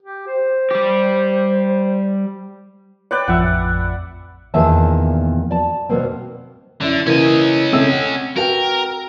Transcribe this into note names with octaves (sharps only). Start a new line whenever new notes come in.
G4
C5
G3 G4
B4 C#5 D5 G5 F#6
A1 F2 E5 F#5
E2 A#2 D#3 G#4 E5 A5
D5 A5
B2 D#3 G3 A#3 C4
F#2 D3 E4
C#3 E3 A#3 C#4 D#5
C#3 A3 C4 E6
F#5
F#4 A#4 B4 G5